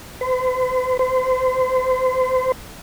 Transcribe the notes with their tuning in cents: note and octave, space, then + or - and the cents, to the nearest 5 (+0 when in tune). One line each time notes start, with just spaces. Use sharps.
C5 -45
C5 -30